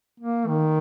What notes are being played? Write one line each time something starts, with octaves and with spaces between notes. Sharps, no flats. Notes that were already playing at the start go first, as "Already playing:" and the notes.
A#3
D#3